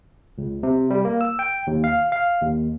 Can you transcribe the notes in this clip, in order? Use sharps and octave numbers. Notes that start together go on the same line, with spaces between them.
C#2
C3
G3
A#3
E6
G5
D#2
F5
F5
D#2